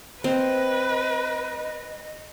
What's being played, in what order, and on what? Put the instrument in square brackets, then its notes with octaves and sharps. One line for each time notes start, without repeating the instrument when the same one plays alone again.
[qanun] C4 [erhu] B4 [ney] D#5